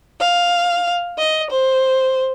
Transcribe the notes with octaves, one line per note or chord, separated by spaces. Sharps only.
F5
D#5
C5